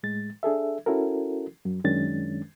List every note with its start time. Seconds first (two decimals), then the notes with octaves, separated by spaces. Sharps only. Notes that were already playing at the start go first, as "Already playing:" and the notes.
0.03 A2 G#3 A6
0.43 D4 G#4 A4 E5
0.86 C#4 E4 F#4 A4 A#4
1.65 F#2 F#3
1.84 F#2 D#3 G#3 C#4 D4 A6